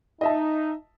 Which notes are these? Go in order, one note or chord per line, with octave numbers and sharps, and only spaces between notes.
D#4 D#5 E5 A5